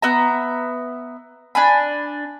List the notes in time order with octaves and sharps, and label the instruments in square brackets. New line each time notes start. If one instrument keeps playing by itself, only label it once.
[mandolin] B3 E5 A#5
D4 G#5 B5